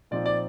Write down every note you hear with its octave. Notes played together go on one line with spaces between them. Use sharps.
A#2 F3 C4 D#4 D5
D5